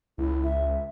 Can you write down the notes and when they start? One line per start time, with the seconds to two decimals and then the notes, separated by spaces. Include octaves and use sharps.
0.18 C#2 E4
0.43 E5